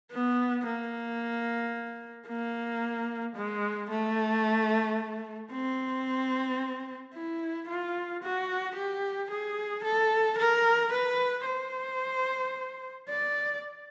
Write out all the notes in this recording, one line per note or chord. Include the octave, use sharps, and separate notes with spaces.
B3
A#3
A#3
G#3
A3
C4
E4
F4
F#4
G4
G#4
A4
A#4
B4
C5
D5